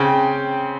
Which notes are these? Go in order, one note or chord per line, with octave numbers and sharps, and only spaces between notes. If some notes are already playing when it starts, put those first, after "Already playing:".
Already playing: C#3 C4 G5